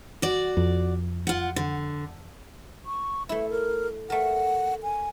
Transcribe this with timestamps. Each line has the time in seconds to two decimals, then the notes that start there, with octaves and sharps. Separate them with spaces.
0.22 F#4 D5
0.57 F2
1.27 F4 F#5
1.56 D3
2.86 C#6
3.29 A3 E4 E5
3.51 A#4
4.10 A3 A#4 F#5
4.83 G#5